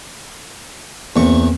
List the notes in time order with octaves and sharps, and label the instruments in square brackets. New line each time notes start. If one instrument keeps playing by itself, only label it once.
[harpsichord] E2 C#6 [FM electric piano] A#3 C4